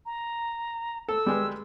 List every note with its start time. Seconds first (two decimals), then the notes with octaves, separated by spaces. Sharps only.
0.06 A#5
1.09 A4 E6
1.26 G3 G#3 B4